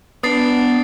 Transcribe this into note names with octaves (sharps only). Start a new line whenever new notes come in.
B3 D4 D#6 A6 C7